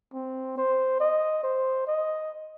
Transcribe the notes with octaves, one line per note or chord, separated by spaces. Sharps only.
C4
C5
D#5
C5
D#5